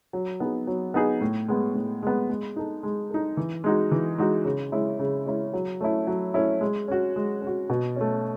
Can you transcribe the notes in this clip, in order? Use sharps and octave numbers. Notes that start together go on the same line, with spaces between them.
F#3
B3 D#4 G#4
F#3
B3 D#4 G#4
A2
G#3 B3
A2
G#3 B3
G#3
D#4 A4
G#3
D#4 A4
E3
G#3 D#4 F#4
E3
G#3 D#4 F#4
C#3
G#3 C#4 E4
C#3
G#3 C#4 E4
F#3
A3 C#4 E4
F#3
A3 C#4 E4
G#3
C#4 F#4
G#3
C#4 F#4
B2
A3 C#4